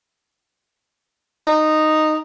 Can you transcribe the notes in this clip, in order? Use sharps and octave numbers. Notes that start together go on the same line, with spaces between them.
D#4